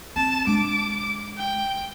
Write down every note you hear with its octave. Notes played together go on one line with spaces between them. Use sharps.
C4 A5
G#3 D4 D6
G5